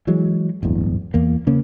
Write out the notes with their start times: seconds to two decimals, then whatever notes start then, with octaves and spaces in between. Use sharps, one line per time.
0.07 E3 F#3 G#3
0.63 D1 G1 E2
1.14 E2 A#3
1.47 C#3 A#3 C#4